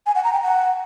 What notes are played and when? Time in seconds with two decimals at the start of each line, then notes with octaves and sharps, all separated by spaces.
0.06 G#5
0.15 F#5
0.24 A#5
0.33 G5
0.41 F#5